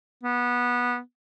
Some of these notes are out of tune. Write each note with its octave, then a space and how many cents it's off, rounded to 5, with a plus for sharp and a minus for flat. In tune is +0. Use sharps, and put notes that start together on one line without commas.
B3 -15